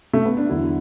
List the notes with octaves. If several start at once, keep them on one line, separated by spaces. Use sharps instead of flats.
A3
B3
D4
E2 D3 F#3 E4